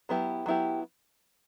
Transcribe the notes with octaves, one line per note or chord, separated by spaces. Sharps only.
F#3 B3 E4 G4
F#3 B3 E4 G4